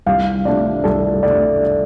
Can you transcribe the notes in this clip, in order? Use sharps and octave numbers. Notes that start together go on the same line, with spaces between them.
C2 F5
C3 A3 D4 D5
C2 A4
C3 A3 D4 D5